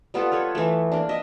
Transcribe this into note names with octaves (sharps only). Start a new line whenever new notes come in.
G3 B3 F4 A4
A4 B4 C#5
E3 A3
A#3 D4
D#5 E5